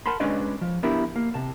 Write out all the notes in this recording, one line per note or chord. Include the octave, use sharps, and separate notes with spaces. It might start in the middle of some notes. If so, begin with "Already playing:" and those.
A#4 F#5 A5 B5 C6
G#3 C#4 D4 B4 D5 D#5
F3
B3 D4 E4 G4 A#4
A#3
C3 A5